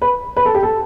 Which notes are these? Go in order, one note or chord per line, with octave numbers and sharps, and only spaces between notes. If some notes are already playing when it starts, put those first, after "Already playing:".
B4
B4
A4
G4
A4